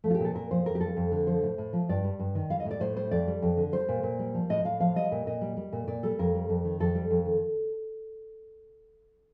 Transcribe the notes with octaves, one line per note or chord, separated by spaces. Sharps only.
F3 A3
F4
G4
A#2 A4
A#2 A#4
F3 C5
F2 A#4
G4
G3 A4
F2
D3
F3 C5
A2
A2
F3
G2 D5
G3
G2
D#3
G3 F5
D#5
A2
D5
A2 C5
G3 C5
F2 D5
G3
F2
D3
G3 C5
A#2
A#2
G3
F3
A2 D#5
A2 F5
F3 F5
G3 D#5
A#2
A#2 D#5
G3
G3
A#2
A#2 D5
G3 A4
F2 A#4
G3
F2
D#3
F2 A4
G3
F2
D#3